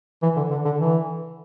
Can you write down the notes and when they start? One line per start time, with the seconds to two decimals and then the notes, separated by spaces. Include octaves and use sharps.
0.23 E3
0.37 D3
0.51 D3
0.65 D3
0.79 E3